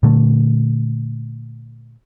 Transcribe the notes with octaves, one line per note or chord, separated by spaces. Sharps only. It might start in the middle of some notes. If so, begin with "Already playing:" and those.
A#2 D3 A3